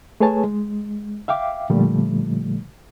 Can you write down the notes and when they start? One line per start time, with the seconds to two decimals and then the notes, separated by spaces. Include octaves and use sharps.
0.20 A3 G#4 B4 C#5 G#5 A5
0.44 G#3
1.28 E5 F5 G5 D6
1.70 A#2 D3 F3 G3 A3